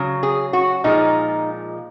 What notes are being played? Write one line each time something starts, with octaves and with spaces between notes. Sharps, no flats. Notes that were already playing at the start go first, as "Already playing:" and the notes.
Already playing: C#3 F#3
G#4
F#4
A#2 F3 G#3 D#4